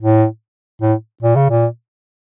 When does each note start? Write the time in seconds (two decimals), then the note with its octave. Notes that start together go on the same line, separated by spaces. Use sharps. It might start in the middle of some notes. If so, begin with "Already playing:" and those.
0.01 A2
0.82 A2
1.22 A#2
1.36 C#3
1.50 A#2